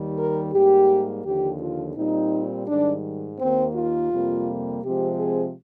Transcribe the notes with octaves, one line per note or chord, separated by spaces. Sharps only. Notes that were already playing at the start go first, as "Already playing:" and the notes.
Already playing: D#2 D#3 G3
A#4
G#2 G3 A#3 G4
D#2 D3 F3 G4
F4
A#2 G3 C4 D#4
G#2 D#3 G3 D4
D#2 D#3 A#3 C4
F4
F2 C3 G3 A#3
C3 F3 G#3 C4 G4
G#4